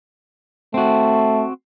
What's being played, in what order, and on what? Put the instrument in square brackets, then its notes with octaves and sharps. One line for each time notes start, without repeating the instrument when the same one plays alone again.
[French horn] A3 [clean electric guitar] C4 F#4